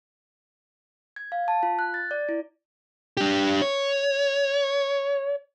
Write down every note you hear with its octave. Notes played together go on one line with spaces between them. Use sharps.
G#6
F5
A5
F4
F#6
A6
D5
E4
D4 G4
C#5